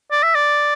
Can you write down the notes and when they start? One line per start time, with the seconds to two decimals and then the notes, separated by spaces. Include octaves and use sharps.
0.12 D5
0.23 E5
0.35 D5